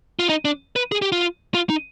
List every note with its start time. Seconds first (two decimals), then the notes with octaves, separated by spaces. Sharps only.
0.19 F4
0.29 D#4
0.45 D4
0.76 B4
0.92 G#4
1.02 G4
1.12 F4
1.55 F4
1.70 D#4